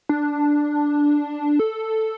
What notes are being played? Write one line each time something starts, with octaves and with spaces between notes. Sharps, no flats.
D4
A4